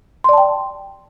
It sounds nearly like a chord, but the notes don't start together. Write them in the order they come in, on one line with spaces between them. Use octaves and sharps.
C6 D5 A5 G5